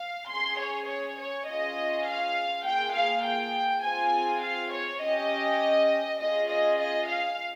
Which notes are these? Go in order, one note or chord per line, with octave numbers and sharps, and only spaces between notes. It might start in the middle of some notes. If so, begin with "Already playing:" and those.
Already playing: F5
C#4 G#4 C6
C#5
C#5
C#5
C#4 F4 G#4 D#5
F5
A#3 F4 G#4 G5
F5
G5
C4 F4 G#4 G#5
F5
C#5
C#4 G4 D#5
C#4 F4 G#4 D#5
D#5
D#5
F5